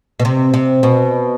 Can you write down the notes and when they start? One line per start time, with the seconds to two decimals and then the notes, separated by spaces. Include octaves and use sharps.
0.20 B2
0.25 C3
0.54 C3
0.83 B2